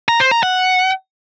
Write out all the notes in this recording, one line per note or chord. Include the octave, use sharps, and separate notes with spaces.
A#5
C5
A#5
F#5